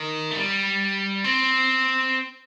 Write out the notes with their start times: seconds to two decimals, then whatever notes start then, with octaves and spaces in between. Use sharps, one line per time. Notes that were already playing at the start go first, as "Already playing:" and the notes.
Already playing: D#3
0.31 A3
0.36 G3
1.24 C4